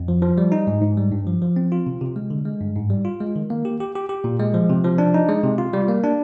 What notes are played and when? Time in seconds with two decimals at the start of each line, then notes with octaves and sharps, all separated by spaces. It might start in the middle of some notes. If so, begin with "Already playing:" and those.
Already playing: F2
0.08 F3
0.22 F3
0.38 G3
0.52 D#4
0.67 G#2
0.82 G#2
0.97 G3
1.12 G2
1.27 F3
1.42 F3
1.56 C4
1.72 F4
1.87 C3
2.01 C3
2.16 G#3
2.30 D3
2.45 G#3
2.61 G2
2.76 G#2
2.90 G3
3.05 F4
3.21 G#3
3.36 D#3
3.50 A#3
3.65 G4
3.80 G4
3.95 G4
4.09 G4
4.24 A#2
4.40 G#3
4.54 F3
4.69 C3
4.84 F3
4.98 D4
5.14 D#4
5.28 G#3
5.44 C3
5.58 F4
5.73 G3
5.88 A#3
6.04 D4